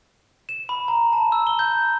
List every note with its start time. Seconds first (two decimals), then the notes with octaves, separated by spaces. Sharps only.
0.49 E7
0.69 B5
0.88 A#5
1.13 A5
1.32 E6
1.47 G7
1.59 G6